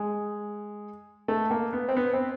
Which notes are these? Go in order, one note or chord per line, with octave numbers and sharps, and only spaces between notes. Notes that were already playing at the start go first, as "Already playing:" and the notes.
Already playing: G#3
A3
A#3
B3
C4
B3
C4